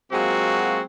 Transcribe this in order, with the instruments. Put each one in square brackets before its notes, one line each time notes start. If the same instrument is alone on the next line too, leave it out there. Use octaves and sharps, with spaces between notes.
[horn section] F#3 G#3 A#3 C4 F4 F#4